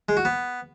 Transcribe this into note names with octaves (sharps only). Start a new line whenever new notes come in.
G#3
F#4
B3